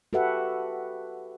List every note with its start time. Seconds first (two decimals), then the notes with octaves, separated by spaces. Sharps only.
0.13 F#4 G4 A4 B4 E5 F#5